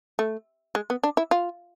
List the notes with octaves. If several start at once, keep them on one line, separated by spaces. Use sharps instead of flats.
A3
G#3
B3
D4
E4
F4